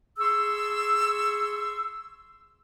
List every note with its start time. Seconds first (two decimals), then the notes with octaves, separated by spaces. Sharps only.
0.19 G#4 C6 C#6 E6